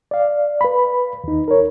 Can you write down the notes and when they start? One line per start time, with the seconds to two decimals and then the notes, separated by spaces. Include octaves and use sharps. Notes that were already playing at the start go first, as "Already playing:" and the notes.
0.11 D5 F5
0.61 B4 B5
1.24 D#2 D#4
1.48 A#4 C#5